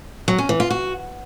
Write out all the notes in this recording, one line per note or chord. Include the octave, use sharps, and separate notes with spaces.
F#3
C#4
E3
F4
F#4